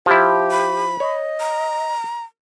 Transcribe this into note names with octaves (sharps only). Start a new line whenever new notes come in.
F3 E4 G4
B5
C#5 D#5
A#5